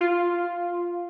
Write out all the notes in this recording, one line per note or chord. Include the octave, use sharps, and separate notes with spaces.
F4